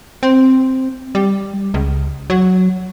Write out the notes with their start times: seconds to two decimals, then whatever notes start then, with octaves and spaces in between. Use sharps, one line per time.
0.23 C4
1.15 G3
1.74 C#2
2.30 F#3